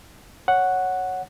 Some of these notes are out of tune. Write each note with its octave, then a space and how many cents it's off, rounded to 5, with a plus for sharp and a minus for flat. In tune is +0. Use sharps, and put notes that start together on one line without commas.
C#5 +0 F#5 +0